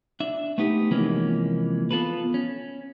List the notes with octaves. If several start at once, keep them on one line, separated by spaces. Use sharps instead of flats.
D4 E5
A3 B3 D#4 G4
C3 E3 F3 G#3 A#3 C#4
B3 F4 A4 B4
C#4